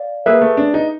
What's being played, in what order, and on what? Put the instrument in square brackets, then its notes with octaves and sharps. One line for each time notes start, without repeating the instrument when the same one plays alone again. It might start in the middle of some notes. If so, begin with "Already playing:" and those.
Already playing: [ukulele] D5 F5
[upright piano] A#3 [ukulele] G#4 B4 E5
[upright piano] A3
D4
D#4